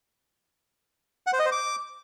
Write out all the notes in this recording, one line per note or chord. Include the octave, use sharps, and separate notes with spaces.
F#5
C5
D#5
C5
D6